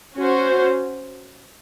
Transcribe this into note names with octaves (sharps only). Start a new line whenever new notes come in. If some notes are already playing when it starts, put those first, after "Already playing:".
C#4 F#4 C5